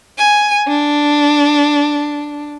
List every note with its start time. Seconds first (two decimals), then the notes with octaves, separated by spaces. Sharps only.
0.18 G#5
0.68 D4